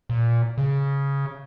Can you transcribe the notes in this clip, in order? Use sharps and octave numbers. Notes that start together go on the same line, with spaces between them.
A#2
C#3